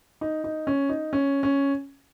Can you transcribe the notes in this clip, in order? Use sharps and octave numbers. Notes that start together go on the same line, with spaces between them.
D#4
D#4
C#4
D#4
C#4
C#4